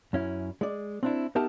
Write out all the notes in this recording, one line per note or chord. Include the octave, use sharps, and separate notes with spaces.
F#2 C#4 E4
G#3 D5
C4 D4 E4
B3 D#4 G4 A#4 E5 A5